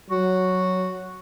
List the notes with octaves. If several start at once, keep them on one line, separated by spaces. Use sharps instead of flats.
F#3 F#4